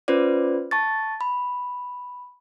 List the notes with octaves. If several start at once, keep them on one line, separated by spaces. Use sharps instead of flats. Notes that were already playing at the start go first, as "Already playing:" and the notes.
C#4 F4 B4 C5 D5
A5 C#6 A6
B5